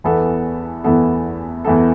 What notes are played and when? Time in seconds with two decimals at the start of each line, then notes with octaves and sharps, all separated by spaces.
0.04 E2 E3 B3 A4
0.84 E2 E3 B3 A4
1.65 E2 E3 B3 A4